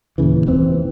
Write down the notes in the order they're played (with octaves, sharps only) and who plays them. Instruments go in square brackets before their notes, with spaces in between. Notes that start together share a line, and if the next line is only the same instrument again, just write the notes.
[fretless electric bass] D#2 A#2 C#3 E3
F1 D#2 E3 C4